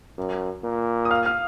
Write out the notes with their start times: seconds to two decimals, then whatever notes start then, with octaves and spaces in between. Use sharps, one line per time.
0.17 F#2
0.63 A#2
1.05 D#6
1.11 F5 F6
1.26 F5 F6